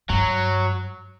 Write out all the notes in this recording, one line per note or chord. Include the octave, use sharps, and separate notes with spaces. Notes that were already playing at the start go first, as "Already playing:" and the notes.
G2 F#3